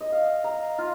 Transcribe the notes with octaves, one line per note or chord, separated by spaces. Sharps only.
D#5
F5
A#5
F4